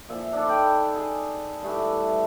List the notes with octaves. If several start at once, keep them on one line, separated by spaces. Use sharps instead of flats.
A#2 F3 E5
D4 D#4 A4
G5 B5
G#4
G2 E3 A3